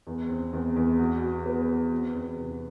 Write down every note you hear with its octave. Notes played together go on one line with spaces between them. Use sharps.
E2
C4
E2
E2
F#4
F#4
B3
F#4
C4
E2
C3